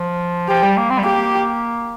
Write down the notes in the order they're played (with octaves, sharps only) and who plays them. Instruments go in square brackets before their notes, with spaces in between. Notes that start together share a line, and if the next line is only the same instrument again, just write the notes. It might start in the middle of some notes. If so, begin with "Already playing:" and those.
Already playing: [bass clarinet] F3
[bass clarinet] F3 [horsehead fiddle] G4
[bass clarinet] G3
A#3
C4
G3
[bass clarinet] A#3 [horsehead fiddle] G4